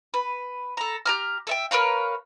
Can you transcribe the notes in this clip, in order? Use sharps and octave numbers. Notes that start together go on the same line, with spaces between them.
B4
A4 A#5
G4 A#5 F6
A4 E5 G5
A#4 B4 C#5 F5